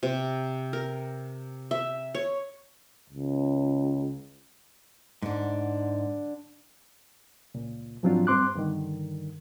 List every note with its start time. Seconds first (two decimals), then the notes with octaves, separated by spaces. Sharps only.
0.03 C3
0.73 A#4
1.71 E5
2.15 C#5
3.10 C#2
5.22 G#2 D3 D4
7.54 C#2 A#2
8.03 G#2 F3 F#3 C4 D4 F4
8.27 G2 C4 C6 D6 F#6
8.55 G2 D3 D#3